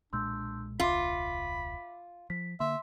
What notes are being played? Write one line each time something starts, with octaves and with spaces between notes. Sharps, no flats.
B1 A#2 G#3 D4 C6 E6 G6
E1 C#2 F4 E5 B5 D6
F3 B6
D3 A#3 E5 C6